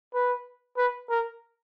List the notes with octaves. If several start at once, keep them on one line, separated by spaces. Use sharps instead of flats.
B4
B4
A#4